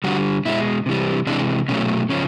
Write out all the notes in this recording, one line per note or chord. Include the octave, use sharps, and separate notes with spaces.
D3 G3 F#4
B2 G#3 E4
C3 E3 G3
C3 E3 G#3 D4
B2 F#3 A3 C#4
C#3 F3 C#4